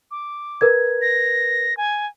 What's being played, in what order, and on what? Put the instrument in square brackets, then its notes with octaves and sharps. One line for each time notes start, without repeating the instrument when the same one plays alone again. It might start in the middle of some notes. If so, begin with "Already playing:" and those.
[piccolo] D6
[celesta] A#4 B4 G#6
[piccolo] A#6
G#5